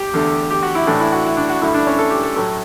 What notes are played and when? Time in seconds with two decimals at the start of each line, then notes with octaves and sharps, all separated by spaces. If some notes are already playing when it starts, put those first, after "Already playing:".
Already playing: G4
0.13 E2 D3 A3
0.51 G4
0.63 F#4
0.75 E4
0.87 A2 E3 A3 D4
1.00 E4
1.12 F#4
1.25 E4
1.37 D4
1.49 F#4
1.62 G2 D3 A3 E4
1.74 D4
1.87 C#4
1.99 A4
2.10 G4
2.23 A4
2.36 A2 F#3 A3